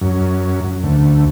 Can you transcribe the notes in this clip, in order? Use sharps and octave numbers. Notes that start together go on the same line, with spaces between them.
F#2
D2